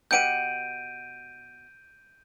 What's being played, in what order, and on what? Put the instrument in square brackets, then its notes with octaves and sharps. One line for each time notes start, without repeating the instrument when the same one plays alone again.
[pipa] B2 G4 F#5 [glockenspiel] G6 D7 D#7